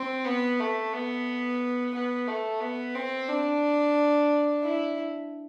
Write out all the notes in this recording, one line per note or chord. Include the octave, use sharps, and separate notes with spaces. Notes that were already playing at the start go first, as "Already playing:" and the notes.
Already playing: C4
B3
A3
B3
B3
A3
B3
C4
D4
E4